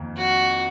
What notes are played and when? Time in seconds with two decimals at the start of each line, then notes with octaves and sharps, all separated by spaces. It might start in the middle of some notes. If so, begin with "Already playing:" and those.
Already playing: F2 D#3 A#3
0.17 F#4